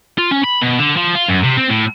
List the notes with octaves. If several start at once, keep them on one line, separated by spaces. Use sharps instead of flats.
F4
C#4
B5
B2
D3
F3
F4
F#2
C3
C4
A2